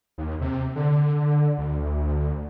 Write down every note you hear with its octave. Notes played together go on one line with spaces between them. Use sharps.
D#2
C3
D3
D2